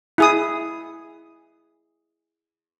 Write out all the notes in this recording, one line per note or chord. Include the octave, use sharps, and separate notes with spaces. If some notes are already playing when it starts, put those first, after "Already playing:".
E4 G#4 D#6